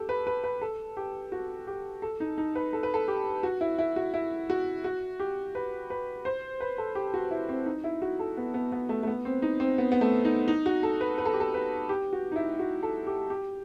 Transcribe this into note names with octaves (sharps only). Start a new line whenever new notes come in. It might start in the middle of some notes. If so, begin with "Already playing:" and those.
Already playing: G4 A4
B4
B4
B4
A4
G4
F#4
G4
A4
D#4
D#4
B4
A4
B4
A4
G4
F#4
E4
E4
F#4
E4
F#4
F#4
G4
B4
B4
C5
B4
A4
G4
F#4
E4
C4
D#4
E4
F#4
A4
B3
B3
B3
A3
A3
B3
C4
D#4
C4
B3
B3
A3
D#4
D#4
F#4
A4
B4
B4
A4
G4
A4
B4
G4
F#4
D#4
E4
F#4
A4
G4
G4